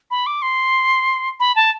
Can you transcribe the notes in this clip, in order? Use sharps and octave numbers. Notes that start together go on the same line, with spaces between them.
B5
D6
C6
B5
A5